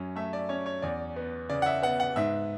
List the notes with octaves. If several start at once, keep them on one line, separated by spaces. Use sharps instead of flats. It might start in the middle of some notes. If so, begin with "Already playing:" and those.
Already playing: F#2 C#4
A3 E5
D5
C#4 C#5
C#5
E2 D5
B3
C#3 D5
F#5
E5
B3 F#5
F#5
G#2 E5